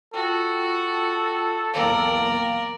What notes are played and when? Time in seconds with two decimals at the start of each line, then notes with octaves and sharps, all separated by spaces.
0.14 F4 F#4 A4 G5
1.73 B1 E2 A#3 A#4 D5 F5 G5